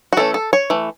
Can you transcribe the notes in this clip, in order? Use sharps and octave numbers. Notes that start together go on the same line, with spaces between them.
F#4
E3 A3 C#4 A4
A4
C#5
E3 A3